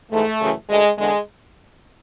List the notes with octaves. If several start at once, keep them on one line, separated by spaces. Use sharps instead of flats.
G#2 E3 A3
F#2 C#3 E3
D2 D3 G#3
E2 D3 G#3